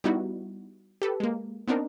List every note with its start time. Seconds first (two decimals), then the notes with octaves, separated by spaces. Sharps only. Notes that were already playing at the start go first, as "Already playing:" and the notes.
0.04 G3 B3 D#4 E4 F#4
1.02 G4 A4 B4
1.20 G#3 A#3
1.68 B3 C4 D4 D#4 A#4